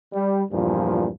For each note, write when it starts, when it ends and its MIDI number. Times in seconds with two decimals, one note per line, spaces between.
0.13 0.43 55
0.52 1.09 40
0.52 1.09 43
0.52 1.09 46
0.52 1.09 53